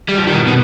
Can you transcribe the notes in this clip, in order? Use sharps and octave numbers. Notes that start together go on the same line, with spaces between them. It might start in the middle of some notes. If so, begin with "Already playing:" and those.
G3
F3
D#3
B2
B2